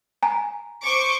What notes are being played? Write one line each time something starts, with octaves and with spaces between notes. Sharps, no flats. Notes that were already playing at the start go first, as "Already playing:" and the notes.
G#5 A#5
C5 C#6 D6